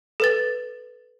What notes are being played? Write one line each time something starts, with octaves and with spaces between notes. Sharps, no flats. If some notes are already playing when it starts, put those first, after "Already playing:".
A4 B4 A6